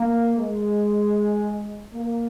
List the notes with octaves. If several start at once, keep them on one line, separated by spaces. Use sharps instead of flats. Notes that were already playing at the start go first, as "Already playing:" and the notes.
Already playing: A#3
G#3
A#3